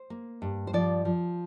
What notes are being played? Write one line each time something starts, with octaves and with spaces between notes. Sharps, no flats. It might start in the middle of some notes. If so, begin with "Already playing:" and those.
Already playing: C5
A#3
G2
C5
F3 D5
F3